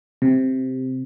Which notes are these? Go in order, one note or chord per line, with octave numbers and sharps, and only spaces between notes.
C3